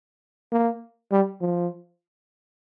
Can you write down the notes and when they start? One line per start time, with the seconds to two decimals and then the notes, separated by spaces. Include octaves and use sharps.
0.52 A#3
1.11 G3
1.41 F3